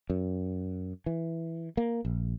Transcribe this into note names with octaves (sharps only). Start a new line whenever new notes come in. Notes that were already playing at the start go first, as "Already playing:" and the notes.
F#2
E3
A#3
A#1